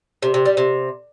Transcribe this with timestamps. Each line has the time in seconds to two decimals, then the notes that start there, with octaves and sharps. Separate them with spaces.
0.22 C3
0.34 C3
0.46 G3
0.57 C3